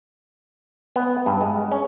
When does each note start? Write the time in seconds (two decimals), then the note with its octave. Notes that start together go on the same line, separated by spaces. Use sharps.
0.96 B3
1.26 G2
1.41 G#3
1.72 C#4